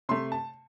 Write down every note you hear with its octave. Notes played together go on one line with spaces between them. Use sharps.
C3 A3 C6
A5